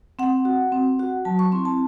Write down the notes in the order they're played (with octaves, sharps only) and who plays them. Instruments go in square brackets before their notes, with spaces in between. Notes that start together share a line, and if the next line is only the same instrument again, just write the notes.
[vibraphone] C4 F#5
F#4
C4
F#4
F#3 A5
C#6
C4 E4 C6
A5